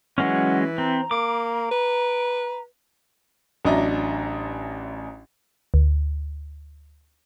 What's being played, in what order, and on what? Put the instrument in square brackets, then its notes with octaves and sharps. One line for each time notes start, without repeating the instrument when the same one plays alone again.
[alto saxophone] E3 [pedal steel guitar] F#3 G#3 C#4 [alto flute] F#5
[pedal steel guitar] C4 [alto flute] A#5
[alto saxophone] A#3 [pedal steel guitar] D6
[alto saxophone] B4
[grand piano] A1 F#3 D4 D#5 E5 A#5
[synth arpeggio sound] D2